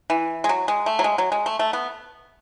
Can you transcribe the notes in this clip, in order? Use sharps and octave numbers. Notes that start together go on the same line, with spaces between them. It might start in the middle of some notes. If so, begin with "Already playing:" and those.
E3
G#3
F#3
G#3
A3
F#3
G#3
F#3
G#3
A3
A3
B3